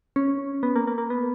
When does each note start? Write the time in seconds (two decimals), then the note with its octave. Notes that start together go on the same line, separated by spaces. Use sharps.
0.16 C#4
0.63 B3
0.76 A#3
0.87 A#3
0.98 A#3
1.10 B3